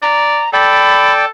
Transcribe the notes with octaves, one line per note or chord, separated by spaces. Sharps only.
D5 A#5
A4 D5 G5 B5